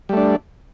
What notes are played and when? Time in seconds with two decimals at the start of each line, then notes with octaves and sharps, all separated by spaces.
0.09 G3
0.13 A3
0.17 D4